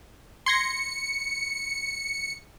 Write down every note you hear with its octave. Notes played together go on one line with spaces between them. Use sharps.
C6 G#6 A#6 C#7